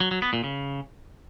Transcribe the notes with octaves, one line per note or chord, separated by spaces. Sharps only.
F#3
F#3
B3
A#2
C#3